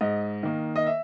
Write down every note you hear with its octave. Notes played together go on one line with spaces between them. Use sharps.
G#2 D#5
D#3 A#3
D#5
E5